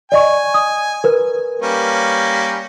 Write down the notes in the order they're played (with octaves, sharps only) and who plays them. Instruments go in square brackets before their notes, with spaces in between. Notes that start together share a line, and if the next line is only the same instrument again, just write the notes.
[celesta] D5 D#5 C#6 [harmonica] G#5
[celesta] D#6
A#4 B4
[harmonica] G3 A#3 C#4